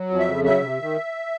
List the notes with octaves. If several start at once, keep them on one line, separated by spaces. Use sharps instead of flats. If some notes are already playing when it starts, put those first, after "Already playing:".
Already playing: F#3
F2
E5
C#3
F#3 E5
C3
D#3